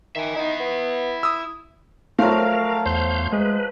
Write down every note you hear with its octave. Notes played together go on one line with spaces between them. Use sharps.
D#3 E5 G#5
D#4 E4 F#5
B3
D#6 E6
F3 F#3 A3 A#4 F5
E2 C5 F5 G6
G#3 B4